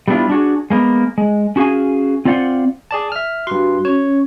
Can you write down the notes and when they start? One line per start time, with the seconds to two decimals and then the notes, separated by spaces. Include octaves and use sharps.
0.08 G3 A3 B3 D4 E4 F4
0.29 D4 F#4 G#4
0.70 G#3 A#3 B3
1.18 G#3
1.56 C#4 F#4 G#4 F5 G#5
2.25 C4 F4 C5 D5 F5 F#5
2.91 G#4 D5 A5
3.12 E5 F6
3.47 G2 F#4 C6
3.85 C#4 C#5